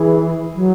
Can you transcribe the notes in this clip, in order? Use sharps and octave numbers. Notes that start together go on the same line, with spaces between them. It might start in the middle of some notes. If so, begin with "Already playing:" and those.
Already playing: E3 G#4
F#3